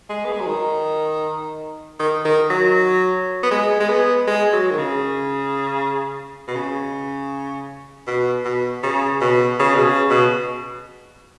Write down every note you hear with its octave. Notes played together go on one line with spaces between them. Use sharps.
G#3
B3
G#3
F#3
D#3
D#3
D#3
F#3
B3
G#3
G#3
B3
G#3
F#3
D#3
C#3
B2
C#3
B2
B2
C#3
B2
C#3
B2
C#3
B2